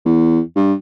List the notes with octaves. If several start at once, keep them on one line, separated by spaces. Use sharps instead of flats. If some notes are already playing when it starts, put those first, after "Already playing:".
E2
G2